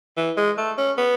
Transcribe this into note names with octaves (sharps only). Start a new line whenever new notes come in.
E3
G#3
A3
C#4
B3